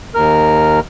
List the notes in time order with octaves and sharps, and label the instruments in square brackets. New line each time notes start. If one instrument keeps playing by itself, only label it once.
[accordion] D#2 A#4 F6